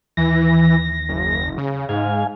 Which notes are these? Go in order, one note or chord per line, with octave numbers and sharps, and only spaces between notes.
D#2 E3 A#6
F#1
C#3
G#2 F5 G#5